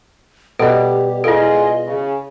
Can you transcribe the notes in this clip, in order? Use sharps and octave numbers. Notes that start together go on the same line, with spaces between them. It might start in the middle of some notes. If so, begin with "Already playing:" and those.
B2 G3 G4 A4 D#5
E4 F4 G#4 A4 D#5
C#3